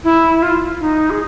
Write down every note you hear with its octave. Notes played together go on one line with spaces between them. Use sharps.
E4
F4
D#4
G#4